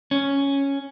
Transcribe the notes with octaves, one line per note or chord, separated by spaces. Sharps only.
C#4